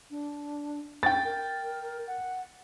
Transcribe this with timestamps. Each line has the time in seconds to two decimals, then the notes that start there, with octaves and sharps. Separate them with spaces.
0.10 D4
1.03 G5 A6
1.25 A#4
2.07 F#5